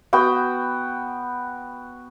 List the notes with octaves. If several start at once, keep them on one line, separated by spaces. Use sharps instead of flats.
B3 F#4 G5